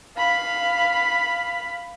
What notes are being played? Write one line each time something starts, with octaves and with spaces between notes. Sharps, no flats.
F5 B5